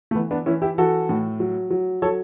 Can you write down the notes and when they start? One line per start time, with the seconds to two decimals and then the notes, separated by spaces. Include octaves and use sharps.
0.11 A3
0.15 E3 B3
0.31 B3 D4
0.46 E3 C#4 E4
0.62 E4 G4
0.78 E3 F#4 A4
1.09 A2
1.40 F#3
1.70 F#3
2.02 F#3 A4 C#5